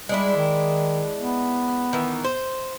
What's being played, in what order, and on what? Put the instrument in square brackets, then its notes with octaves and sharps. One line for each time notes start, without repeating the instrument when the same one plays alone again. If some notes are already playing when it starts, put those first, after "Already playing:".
[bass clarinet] G3 [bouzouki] G#3 D4 E4
[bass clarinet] D#3
B3
[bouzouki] D#3 E3
C5